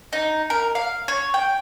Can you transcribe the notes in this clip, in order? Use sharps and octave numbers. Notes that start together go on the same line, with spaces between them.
D#4
A#4
F5
C#5
G5